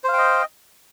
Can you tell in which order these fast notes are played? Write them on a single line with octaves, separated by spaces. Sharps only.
C5 F5 G5 D#5